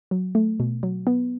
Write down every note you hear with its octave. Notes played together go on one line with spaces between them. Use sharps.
F#3
A3
B2
F#3
B3